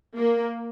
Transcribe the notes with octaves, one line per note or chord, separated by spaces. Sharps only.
A#3